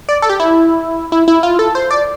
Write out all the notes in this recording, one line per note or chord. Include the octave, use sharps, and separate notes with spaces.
D5
A4
G4
E4
E4
E4
F4
A4
C5
D5